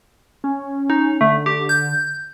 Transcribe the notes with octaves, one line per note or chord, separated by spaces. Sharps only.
C#4
D#4
D3 A3
G4
G6